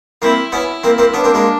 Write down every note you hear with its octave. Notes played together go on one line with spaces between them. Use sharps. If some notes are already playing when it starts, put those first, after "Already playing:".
A#3 C4 E4
B3 C#4 E4
A#3 C4
A#3 C4
B3 C#4 D4
A#3 C4
G#3 A#3